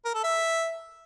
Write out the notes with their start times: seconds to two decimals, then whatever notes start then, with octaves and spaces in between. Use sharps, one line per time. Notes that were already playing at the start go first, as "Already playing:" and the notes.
0.05 A#4
0.14 A4
0.24 E5